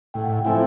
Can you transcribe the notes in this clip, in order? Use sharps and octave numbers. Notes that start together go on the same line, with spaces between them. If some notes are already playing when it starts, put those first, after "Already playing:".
A2 G5
F#5
G5
F3 A3 C4 E4 G#5